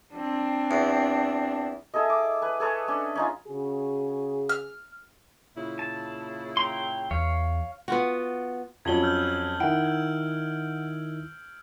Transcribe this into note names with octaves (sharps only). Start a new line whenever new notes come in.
C4 D4
E2
E4 G#4 A4 D#5
D6
B4 G#5
G#4 A4 B4 C#5
C#4 D4 G#5
C#4 D#4 F4
C#3 F#4 G#4
F6
A#2 C#3 E4
A5
G5 A#5 C6
E2 C#5 F5
B3 F4 F#4
F2 F#3 C#4 G#6 F#7 G7
E6 F6 G6
D#3 E4 F#5 D7
G6